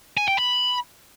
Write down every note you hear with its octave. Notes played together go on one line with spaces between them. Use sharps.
G#5
G5
B5